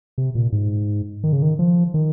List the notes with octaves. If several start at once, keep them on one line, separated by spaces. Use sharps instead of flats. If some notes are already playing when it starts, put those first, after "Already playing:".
C3
A#2
G#2
D#3
C#3
D#3
F3
D#3